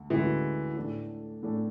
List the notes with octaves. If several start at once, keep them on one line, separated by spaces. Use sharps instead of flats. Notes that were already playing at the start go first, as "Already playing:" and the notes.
Already playing: D2
D2 D3 E3 G#3 C#4 F#4
A2 E3 A3 D4
A2 E3 A3 D4